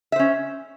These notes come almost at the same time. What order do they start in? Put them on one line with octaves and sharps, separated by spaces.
E5 C5 C#4